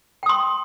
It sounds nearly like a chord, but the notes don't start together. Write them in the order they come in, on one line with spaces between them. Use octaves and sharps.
G5 D#6 C6